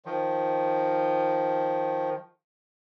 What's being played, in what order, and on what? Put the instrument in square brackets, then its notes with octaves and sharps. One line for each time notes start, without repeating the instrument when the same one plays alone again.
[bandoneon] D#3 F3